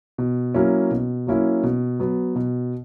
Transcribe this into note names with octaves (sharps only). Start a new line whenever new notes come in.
B2
F#3 A#3 C#4 E4
B2
F#3 A#3 C#4 E4
B2
F#3 B3
B2